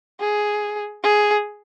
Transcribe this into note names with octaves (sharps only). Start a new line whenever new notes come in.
G#4
G#4